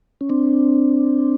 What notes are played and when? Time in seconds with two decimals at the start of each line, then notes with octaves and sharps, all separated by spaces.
0.21 C#4
0.29 C4 D4